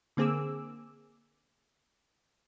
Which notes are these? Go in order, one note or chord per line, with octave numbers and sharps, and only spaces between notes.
D3 A#3 C4 G#4 D6 E6